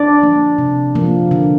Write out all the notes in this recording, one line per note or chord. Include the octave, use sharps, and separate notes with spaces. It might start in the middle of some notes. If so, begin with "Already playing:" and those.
Already playing: D4 D5
F3 A#3
C3
F3 A#3
D3